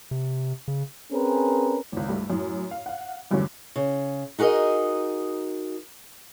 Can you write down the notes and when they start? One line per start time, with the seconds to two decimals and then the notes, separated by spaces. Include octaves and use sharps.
0.11 C3
0.68 C#3
1.12 C4 C#4 G#4 A#4 B4
1.92 G#1 C#2
2.09 G2 A3
2.30 F#2 A2
2.71 F5
2.86 F5 F#5
3.31 E2 G2 D3 F#3 A3 C#4
3.76 C#3
4.39 D#4 F#4 G#4 A#4 D#5